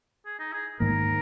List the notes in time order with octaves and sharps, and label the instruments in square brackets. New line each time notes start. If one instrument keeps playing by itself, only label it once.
[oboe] G#4
D#4
G#4
[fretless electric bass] G#2 D#3 A#3 [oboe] A#4